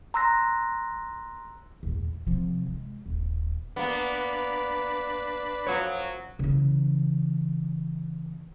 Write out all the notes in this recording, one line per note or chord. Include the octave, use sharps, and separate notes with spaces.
A#5 C6 E6 F#6 A#6
E2 A#2
D2
C3 F3
G#3
D#1 A1
A#3 B3 D4 B4
F#2 F3 F#3 C#5
C#3 E3